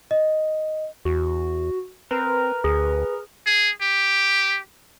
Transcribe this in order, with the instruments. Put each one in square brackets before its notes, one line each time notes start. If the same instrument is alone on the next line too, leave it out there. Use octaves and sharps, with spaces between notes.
[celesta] D#5
[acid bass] E2 [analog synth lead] F#4
[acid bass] C4 [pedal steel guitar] A#4 [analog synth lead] B4
[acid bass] D2 [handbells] G#4
[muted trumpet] G#4
G4